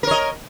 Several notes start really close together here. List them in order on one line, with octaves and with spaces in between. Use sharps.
A#4 C#5 D#5